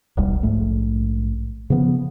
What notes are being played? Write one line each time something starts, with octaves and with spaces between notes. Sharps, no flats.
D#1 B1 G3
A#1 G#2 A3
C#3 F3 B3